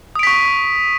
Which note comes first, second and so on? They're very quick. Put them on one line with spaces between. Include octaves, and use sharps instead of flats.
D#6 D7 B6 C#6